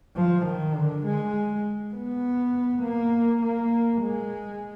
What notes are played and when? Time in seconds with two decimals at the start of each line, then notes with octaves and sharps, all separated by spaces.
0.16 F3
0.46 D#3
0.76 D3
1.06 G#3
1.94 B3
2.83 A#3
3.42 A#3
4.02 G#3